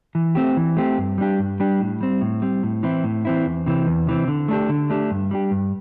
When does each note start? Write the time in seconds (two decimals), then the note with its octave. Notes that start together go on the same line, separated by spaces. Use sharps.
0.15 E3
0.35 A3 C4 G4
0.57 E3
0.77 A3 C4 G4
0.98 G2
1.18 G3 D4 G4
1.39 G2
1.60 G3 D4 G4
1.81 A2
2.01 G3 C4
2.21 A2
2.42 G3 C4
2.63 A2
2.83 E3 C4 E4
3.04 A2
3.25 E3 C4 E4
3.45 E2
3.66 C3 E3 C4
3.87 E2
4.07 C3 E3 C4
4.28 D3
4.48 A3 D4 G4
4.69 D3
4.90 A3 D4 G4
5.11 G2
5.31 G3 D4 G4
5.51 G2